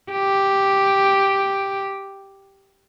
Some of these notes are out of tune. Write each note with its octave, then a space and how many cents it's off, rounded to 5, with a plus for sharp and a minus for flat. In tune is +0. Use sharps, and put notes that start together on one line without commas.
G4 +0